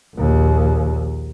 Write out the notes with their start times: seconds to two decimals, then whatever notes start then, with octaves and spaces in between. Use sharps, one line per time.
0.15 A#1 D#2